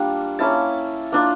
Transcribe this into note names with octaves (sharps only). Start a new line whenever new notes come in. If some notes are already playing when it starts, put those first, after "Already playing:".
Already playing: G3 A#3 D4 F4 A5
A#3 C#4 E4 A5
A#3 D4 F4